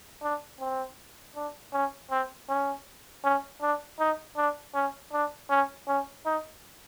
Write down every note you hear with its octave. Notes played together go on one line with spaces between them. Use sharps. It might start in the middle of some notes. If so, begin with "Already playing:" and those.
D4
C4
D4
C#4
C4
C#4
C#4
D4
D#4
D4
C#4
D4
C#4
C#4
D#4